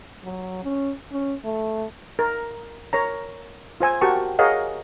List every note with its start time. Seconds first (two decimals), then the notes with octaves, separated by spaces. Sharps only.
0.24 F#3
0.64 C#4
1.11 C#4
1.44 A3
2.19 A#4
2.93 A#4 C#5 A#5
3.80 F4 C5 G#5 E6
4.01 F#4 G4 A#4 G5 A5 C#6
4.39 G#4 A#4 C#5 D#5 F5 F#5